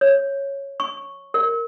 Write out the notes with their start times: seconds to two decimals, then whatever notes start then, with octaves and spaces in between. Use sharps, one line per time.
0.01 C#5
0.80 C#6
1.34 A#4